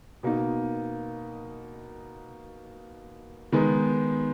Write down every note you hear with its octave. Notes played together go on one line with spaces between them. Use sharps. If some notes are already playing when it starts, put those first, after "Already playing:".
B2 A#3 D#4
D#3 G#3 B3 D#4